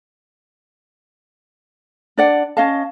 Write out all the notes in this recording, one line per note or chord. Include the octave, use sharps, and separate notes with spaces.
D4 D5 F#5
C#4 D#5 F5 A5